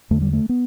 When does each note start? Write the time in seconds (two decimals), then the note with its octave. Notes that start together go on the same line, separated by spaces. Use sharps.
0.10 E2 D3 A3
0.22 G3
0.33 A3
0.49 B3